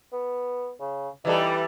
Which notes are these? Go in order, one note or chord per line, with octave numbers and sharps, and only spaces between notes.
B3
C#3
E3 G3 D#4 A4